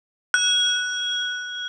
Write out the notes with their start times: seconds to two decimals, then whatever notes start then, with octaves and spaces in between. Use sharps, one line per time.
0.34 F#6